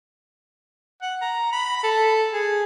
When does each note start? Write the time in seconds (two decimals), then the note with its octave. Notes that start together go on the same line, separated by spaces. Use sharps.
1.02 F#5
1.22 A#5
1.52 B5
1.83 A4
2.32 G#4